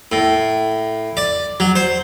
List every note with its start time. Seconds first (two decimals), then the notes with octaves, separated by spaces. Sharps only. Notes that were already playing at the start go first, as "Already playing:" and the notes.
0.12 A2
1.17 D5
1.60 F#3
1.76 C5